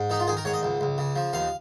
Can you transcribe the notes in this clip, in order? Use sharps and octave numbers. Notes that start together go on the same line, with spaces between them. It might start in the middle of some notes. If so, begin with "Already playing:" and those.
Already playing: G#2
D#3 D#4
F4
D#3 G#4
A#4
G#2 C#5
D#5
C#2
C#2
C#3
F3
D#2 F5